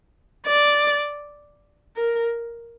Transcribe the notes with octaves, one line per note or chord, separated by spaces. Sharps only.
D5
A#4